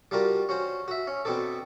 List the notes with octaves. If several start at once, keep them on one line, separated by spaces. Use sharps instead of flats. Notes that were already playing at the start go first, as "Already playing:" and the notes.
G3 D4 F4 F#4 A#4
C#4 F#4 C5
F#4 E5
C#4
B2 B3 C4 D4 A4